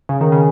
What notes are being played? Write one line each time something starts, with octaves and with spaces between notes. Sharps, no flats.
C#3
D#3
C#3